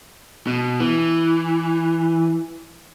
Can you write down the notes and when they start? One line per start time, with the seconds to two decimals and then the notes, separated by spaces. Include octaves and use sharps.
0.47 B2
0.80 E3